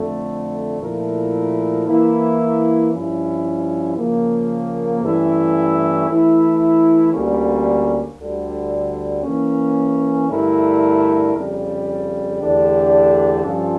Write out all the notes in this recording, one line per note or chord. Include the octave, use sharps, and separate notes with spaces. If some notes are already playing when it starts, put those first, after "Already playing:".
Already playing: F2 D3 A3
A#2 F3 A3 E4 A#4
E3 A#3 E4
G2 F3 C#4 E4
C#3 F3 A#3
G2 E3 A3 C#4 E4
E3 A3 E4
D2 D3 G3 A#3 C#4
D2 D3 G3
E3 A#3 C#4
G2 D3 A3 E4 A#4
F2 C#3 G3
E2 D3 A3 D4 G4
G2 F3 C#4 F4 A4